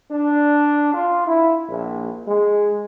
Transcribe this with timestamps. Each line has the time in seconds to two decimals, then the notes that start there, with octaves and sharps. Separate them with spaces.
0.11 D4
0.94 F4
1.26 E4
1.68 A#1
2.27 G#3